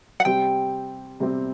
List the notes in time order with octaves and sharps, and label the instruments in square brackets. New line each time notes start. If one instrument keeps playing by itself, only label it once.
[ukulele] F#5
[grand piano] C3 G3 C4 G4 [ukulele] G5
[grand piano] C3 G3 C4 G4